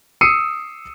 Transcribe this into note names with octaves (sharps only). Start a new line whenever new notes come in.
D#6 E6 C7 C#7 D#7